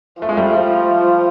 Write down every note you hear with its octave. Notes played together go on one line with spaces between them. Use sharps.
F3 A3
G#3
G3 A3